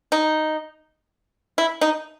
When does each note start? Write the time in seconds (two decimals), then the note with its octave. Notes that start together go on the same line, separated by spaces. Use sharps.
0.12 D#4
1.58 E4
1.81 D#4